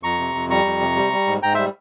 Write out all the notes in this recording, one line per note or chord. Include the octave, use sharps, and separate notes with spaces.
F2 A#5 C#6
C3
F2
G3 A#5 C#6
F2
C3
G3
G3
G#2
G#2 G5 A#5
G3 C5 E5